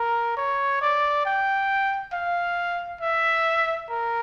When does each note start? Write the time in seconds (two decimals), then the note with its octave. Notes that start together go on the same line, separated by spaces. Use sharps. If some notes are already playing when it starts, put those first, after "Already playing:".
Already playing: A#4
0.37 C#5
0.82 D5
1.26 G5
2.13 F5
3.01 E5
3.89 A#4